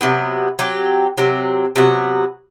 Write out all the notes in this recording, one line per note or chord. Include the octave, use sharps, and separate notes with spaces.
C3 F#3 B3
F#3 C4 G4
C3 F#3 C4
C3 F#3 B3 F#4